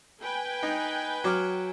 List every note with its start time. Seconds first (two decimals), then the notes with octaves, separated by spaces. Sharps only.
0.22 B4 G5 G#5
0.63 D#4
1.24 F#3 D6 F6